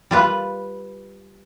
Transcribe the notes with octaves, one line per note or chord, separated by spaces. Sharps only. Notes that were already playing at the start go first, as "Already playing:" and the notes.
G3 F4 B4